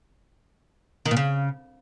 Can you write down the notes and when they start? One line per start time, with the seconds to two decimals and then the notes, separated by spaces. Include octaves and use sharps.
1.05 D#3
1.11 A#2
1.17 C#3